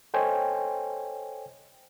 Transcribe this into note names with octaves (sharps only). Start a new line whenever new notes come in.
A4 C5 C#5 D#5 G5 G#5